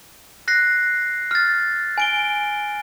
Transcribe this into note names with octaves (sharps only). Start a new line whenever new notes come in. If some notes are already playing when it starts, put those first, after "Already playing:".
F#6 A#6 C7
F6 A6
G#5 D7 G7